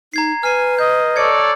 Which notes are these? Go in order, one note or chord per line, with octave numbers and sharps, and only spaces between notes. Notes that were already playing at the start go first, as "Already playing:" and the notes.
D#4 A#5 G#6 C7
B4 G#5 F6 C7
D#5 G6
A4 C#5 D5 G#6 C#7